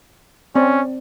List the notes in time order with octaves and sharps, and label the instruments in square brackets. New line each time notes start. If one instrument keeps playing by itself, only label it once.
[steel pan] C4 D5 [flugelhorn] C#4